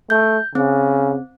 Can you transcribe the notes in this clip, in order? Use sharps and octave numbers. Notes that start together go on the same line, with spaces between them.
A3 G6
C#3 C4